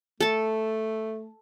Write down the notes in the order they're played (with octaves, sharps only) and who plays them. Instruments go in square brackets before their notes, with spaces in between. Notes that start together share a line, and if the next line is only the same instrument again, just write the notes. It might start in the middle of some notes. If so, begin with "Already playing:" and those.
[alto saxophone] A3 [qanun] A4 A5